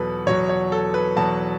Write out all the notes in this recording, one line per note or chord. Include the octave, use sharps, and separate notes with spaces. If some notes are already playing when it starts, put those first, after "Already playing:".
Already playing: E2 B2 F#3 A4 B4
E2 B2 F#3 C#5
C#5
A4
B4
E2 B2 F#3 A5